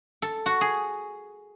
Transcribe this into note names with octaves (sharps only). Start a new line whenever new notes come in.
A4
F#4
G#4